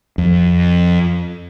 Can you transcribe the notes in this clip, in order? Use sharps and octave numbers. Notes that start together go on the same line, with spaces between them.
F2